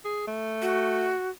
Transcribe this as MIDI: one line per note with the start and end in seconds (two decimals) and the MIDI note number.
0.05 0.26 68
0.27 1.15 57
0.62 1.29 66